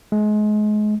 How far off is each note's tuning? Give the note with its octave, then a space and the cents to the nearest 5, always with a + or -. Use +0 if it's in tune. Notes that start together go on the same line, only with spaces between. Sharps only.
G#3 +30